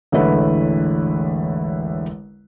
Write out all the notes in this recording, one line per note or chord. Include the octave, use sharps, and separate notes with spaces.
E1 A1 D3 A3 E4 B4